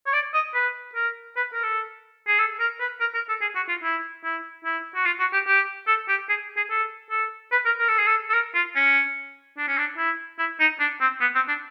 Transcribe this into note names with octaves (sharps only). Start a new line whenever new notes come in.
C#5
D5
D#5
B4
A#4
B4
A#4
A4
G#4
A4
A#4
B4
A#4
A#4
A4
G#4
F#4
F4
E4
E4
E4
F#4
F4
F#4
G4
G4
A4
G4
G#4
G#4
A4
A4
B4
A#4
A#4
A4
G#4
A4
A4
A#4
F4
C#4
D4
C#4
D4
E4
E4
D#4
D4
C4
B3
C4
D4